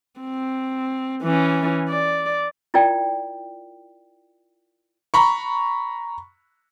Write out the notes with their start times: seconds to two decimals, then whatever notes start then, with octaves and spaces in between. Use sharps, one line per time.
0.21 C4
1.22 E3 C#4
1.89 D5
2.74 E4 F4 A#4 D5 G5
5.14 A#5 B5 C#6